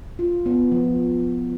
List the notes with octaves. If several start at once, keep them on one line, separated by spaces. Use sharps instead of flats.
F4
B3
F3